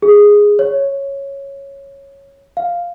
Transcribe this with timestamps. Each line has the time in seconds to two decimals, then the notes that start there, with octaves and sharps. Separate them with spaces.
0.02 G#4
0.59 C#5
2.57 F5